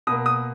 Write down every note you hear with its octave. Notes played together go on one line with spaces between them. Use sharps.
B2 A#3 D#6
D#6